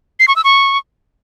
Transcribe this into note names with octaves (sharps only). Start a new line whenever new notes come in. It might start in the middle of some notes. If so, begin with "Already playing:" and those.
C7
C#6
E6
C#6